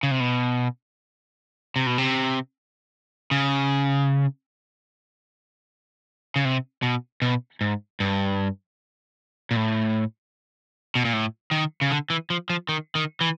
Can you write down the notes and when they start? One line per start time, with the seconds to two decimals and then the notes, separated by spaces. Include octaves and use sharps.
0.03 C#3
0.11 C3
0.20 B2
1.76 C3
1.86 B2
1.98 C3
3.31 C#3
6.36 C#3
6.45 C3
6.83 B2
7.22 B2
7.61 G#2
8.00 G2
9.51 A#2
9.57 A2
10.95 B2
11.05 A#2
11.13 A2
11.51 D#3
11.81 C#3
11.91 D3
12.10 E3
12.30 F3
12.50 F3
12.69 D#3
12.95 D#3
13.21 E3